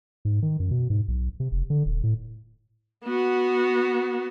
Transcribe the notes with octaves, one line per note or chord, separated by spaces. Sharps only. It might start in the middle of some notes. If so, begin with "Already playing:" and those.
G#2
D#3
F#2
B2
G#2
B1
C3
F1
D3
D#1
A2
B3 F#4